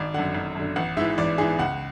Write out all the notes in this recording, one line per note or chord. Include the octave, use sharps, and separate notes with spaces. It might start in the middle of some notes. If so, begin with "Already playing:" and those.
Already playing: G#1 D5
F#2 D3 F#5
G#1
F#2 D3
A1 F#5
G#2 E3 E5
A1 D5
G#2 E3 G#4
C#2 F#5